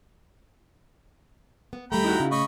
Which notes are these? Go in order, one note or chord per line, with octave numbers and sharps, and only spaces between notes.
B3
D#2 G3 A3 G5 A#5 B5
D#4 E4 F#4
C#3
A2 D#5 B5 C#6